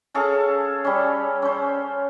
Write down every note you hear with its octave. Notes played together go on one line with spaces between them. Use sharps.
C#4 G#4 A4 F5
G3 C#4
C#4 C5